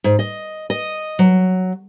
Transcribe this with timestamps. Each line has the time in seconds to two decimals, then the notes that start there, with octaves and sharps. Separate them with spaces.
0.04 G#2
0.19 D#5
0.70 D#5
1.19 F#3